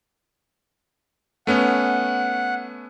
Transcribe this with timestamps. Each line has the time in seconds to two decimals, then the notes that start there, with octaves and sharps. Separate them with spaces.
1.47 A3 B3 C#4 F#5